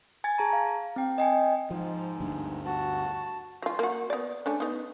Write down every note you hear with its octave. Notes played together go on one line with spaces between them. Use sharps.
G#5 G#6 A6
G#4 A5 A#5
F5
C4 G5
D#5 G5 G#5
G#2 F3
D2 G2
F#4 A5
F#3 F4
A#3 F#4
B3 D5
A3 C#4 D4
B3 D#4